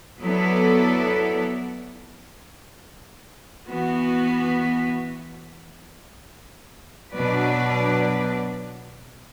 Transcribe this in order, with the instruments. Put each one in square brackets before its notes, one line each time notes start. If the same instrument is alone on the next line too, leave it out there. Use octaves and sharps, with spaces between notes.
[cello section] F#3 B3 E4 A4 D5
E3 B3 F#4
B2 F#3 D4 B4 D5